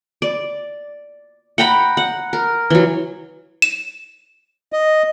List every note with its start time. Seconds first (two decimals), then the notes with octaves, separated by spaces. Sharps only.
0.22 D5
1.58 F#5 G5 A#5 B5
1.97 F#5
2.33 A#4
2.70 E3 F#3
3.62 E7
4.73 D#5